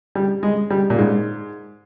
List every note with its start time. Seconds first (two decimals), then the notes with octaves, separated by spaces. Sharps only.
0.15 G3
0.43 G#3
0.70 G3
0.90 A#2
0.98 G#2